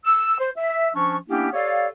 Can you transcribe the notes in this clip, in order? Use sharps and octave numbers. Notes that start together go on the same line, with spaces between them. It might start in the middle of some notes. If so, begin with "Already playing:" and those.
E6
C5
E5
F3 C#4 D4 C#6
A#3 B3 C#4 D4 E4 G4
G4 A4 C#5 D5 F5